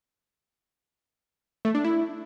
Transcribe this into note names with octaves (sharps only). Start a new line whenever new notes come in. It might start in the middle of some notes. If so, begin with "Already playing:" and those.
A3
D4
E4